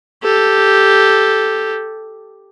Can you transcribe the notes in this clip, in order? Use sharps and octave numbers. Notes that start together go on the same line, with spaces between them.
G4 A4